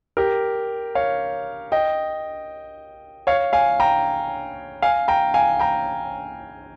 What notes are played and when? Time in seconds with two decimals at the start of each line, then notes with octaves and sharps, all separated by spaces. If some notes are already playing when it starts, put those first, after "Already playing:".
0.17 G4 A#4
0.95 C#5 F5
1.72 D#5 G5
3.27 C#5 F5
3.53 F5 G#5
3.80 G5 A#5
4.82 F5 G#5
5.08 G5 A#5
5.34 F5 G#5
5.59 G5 A#5